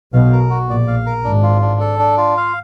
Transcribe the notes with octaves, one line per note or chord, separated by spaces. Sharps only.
B1 B2 F5
A#4
F#4
A#1 A#2 D5
F5
A#4
G#1 G#2 D4
F4
D4
A4
D4
F4
F5